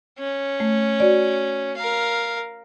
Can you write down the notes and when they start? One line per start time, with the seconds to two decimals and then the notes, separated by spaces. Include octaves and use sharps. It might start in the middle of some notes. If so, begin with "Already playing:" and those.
0.19 C#4
0.60 A3
1.00 F#4 D5
1.76 A#4 F5